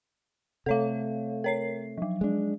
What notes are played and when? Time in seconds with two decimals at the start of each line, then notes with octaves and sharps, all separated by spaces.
0.66 C3 A3 A4 C#5 F5
1.44 A#4 C#5 C7
1.98 F3 F#3
2.21 G#3 D4